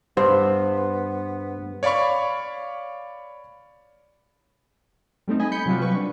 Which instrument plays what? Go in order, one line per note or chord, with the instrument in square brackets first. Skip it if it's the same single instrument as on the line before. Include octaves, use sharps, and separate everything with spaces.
[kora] G2 [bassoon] B3 [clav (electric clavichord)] C5
[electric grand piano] C#5 D5 F5 B5 C#6
[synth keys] G3 A3 C4 D#4
D#5 G#5 B5
B5 G6 C#7
C3 F#3 G3 F4 F#4
B4 C#6
D4